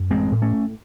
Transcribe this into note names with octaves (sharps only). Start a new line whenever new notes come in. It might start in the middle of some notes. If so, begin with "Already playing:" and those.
Already playing: F#2
A1 G#3 C4
A2
A3 C#4
A2